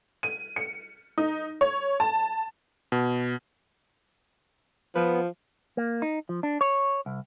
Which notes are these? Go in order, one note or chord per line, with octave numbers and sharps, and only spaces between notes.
D#7
C#7
D#4
C#5
A5
B2
F3 B3
A#3
D#4
F3
D4
C#5
C2